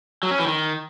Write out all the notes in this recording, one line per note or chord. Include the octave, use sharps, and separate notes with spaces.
F#3
C#4
E3
D#3